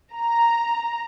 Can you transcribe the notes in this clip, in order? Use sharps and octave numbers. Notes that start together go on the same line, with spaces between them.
A#5